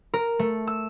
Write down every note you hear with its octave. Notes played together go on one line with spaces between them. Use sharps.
A#4
A3
E6